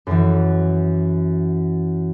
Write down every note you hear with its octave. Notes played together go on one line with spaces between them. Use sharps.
F#2 E3